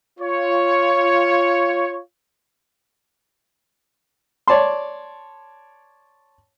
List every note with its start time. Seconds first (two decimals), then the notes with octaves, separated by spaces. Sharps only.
0.20 F4 C#5
4.48 C#5 D5 A5 C6